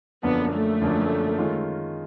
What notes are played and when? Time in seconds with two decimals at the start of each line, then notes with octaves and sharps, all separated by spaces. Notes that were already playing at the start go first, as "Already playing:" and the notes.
0.23 F#2 D3 F3 A#3 B3 D4
0.52 A3
0.81 F#2 D3 F3 A#3 D4
1.38 D#3 G#3 C#4 F4